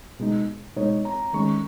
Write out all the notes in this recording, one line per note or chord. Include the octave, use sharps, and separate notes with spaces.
B2 G#3 D#4
B2 G#3 D#4 C#5
A#5
D#3 G#3 C#4 C#6